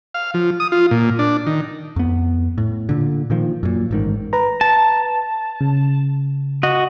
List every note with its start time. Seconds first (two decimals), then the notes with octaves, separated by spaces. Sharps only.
0.14 F5
0.34 F3
0.60 D#6
0.72 F4
0.91 A#2
1.19 D4
1.47 D#3
1.96 F2 B3
2.58 A2
2.89 A#2 D3
3.30 A#2 D#3 F3
3.63 F#2 A#2
3.91 A1 G#2 D#3
4.33 B4 A#5
4.61 A5
5.61 C#3
6.63 F#4 D#5